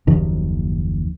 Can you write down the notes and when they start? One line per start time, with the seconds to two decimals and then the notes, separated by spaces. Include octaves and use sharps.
0.07 F#1 D#2 D#3 F3